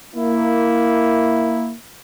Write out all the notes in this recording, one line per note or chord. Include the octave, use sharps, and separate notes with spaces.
A#3 E4